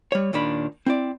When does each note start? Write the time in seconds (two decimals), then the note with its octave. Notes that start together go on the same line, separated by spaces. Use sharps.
0.12 G3 C#5
0.33 D#2 A#2 D#3 D4 B5
0.86 C4 E4 D5